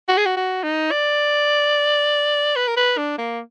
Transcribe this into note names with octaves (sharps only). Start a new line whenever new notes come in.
F#4
G#4
F#4
F#4
D#4
D5
B4
A#4
B4
D4
A#3